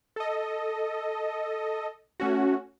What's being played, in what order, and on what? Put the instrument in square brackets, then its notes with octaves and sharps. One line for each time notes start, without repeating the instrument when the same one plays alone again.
[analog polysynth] A4 D#5
A3 C#4 F#4